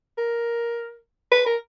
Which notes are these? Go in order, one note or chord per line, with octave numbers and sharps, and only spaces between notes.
A#4
B4
A#4